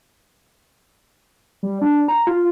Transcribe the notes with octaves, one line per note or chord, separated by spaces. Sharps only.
G3
D4
A#5
F4